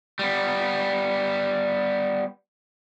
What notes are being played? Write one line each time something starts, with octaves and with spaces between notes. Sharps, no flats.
G3 B3